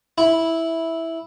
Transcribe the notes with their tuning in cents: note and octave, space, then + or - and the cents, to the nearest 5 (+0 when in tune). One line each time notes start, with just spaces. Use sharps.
E4 -10